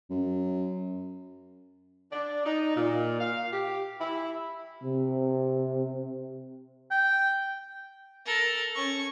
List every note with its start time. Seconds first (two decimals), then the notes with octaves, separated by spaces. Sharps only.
0.10 F#2
2.12 D4
2.46 D#4
2.75 A#2
3.20 F5
3.53 G4
4.00 E4
4.84 C3
6.91 G5
8.25 A4 A#4
8.75 C#4 C#6